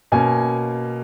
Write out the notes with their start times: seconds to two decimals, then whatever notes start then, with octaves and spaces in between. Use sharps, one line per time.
0.12 B2 A#3 C#4 G#5